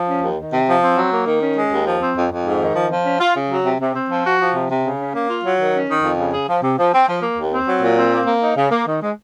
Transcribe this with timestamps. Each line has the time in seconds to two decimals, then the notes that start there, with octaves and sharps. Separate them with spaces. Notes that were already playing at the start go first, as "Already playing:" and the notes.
Already playing: F3
0.08 C#4
0.22 D#2
0.37 D#3
0.52 C3
0.67 F3
0.83 C4
0.97 F#3
1.12 A#3
1.26 D#3
1.42 C#4
1.56 G#3
1.72 D#2
1.86 F3
2.02 C4
2.16 F2
2.31 F2
2.45 G#2
2.61 D#3
2.75 F3
2.91 F3
3.06 C#4
3.20 F4
3.36 C#3
3.50 F#3
3.65 C3
3.81 C3
3.94 C4
4.10 F3
4.25 F#4
4.39 F3
4.55 C3
4.69 C3
4.84 C#3
4.99 C#4
5.14 A#3
5.29 F4
5.44 F#3
5.59 D#3
5.74 C#4
5.89 D#3
6.03 F2
6.18 C#3
6.33 G#4
6.49 F3
6.62 C3
6.78 F3
6.93 C4
7.08 F3
7.22 A#3
7.37 D#2
7.52 C4
7.67 F#3
7.82 A#2
7.97 C4
8.13 A#3
8.26 A#3
8.42 D#4
8.56 C#3
8.71 A#3
8.87 D#3
9.02 G#3